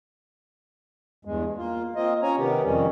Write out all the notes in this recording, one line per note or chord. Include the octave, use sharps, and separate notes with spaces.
E2 G2 G#3
A#3 F4
A#3 C4 F4 D#5
C#4 C#5 G#5 A#5
C3 D#3 B3 G4
F2 D#3 G3 C#4